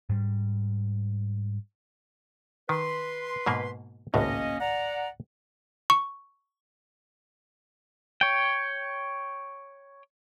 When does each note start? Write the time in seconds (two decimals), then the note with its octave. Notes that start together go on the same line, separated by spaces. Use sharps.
0.09 G#2 G3
2.69 D#3 B4 C6
3.46 G#2 B2 A#3
4.14 G#1 C#2 A2 A#3 C#4 D#5
4.60 D5 F#5 A#5
5.90 C#6
8.21 C#5 G5